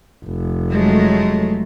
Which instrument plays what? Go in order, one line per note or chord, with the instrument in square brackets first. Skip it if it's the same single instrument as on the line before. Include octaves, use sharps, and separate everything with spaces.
[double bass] F1
[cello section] F#3 G#3 A3